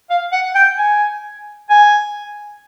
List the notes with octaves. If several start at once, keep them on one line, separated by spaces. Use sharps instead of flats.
F5
F#5
G5
G#5
G#5